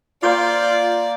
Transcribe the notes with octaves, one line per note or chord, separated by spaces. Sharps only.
A#3 F4 C5 D5 G5